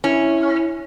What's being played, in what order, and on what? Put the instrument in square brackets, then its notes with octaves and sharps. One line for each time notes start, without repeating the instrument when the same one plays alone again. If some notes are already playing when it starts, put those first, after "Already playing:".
[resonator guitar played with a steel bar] C#4 [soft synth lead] E4